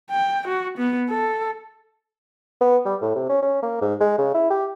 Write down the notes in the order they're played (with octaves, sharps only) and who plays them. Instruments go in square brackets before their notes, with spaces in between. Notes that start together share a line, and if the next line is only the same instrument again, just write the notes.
[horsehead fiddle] G5
F#4
B3
A4
[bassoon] B3
G3
A2
C3
C#4
C#4
A#3
G#2
G#3
C#3
E4
G4